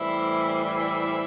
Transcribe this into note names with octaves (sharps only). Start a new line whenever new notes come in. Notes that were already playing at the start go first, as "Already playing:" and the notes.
Already playing: A2 E3 G3 C4 E4 E5
E4 E5